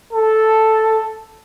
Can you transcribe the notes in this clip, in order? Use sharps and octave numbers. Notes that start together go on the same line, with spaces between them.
A4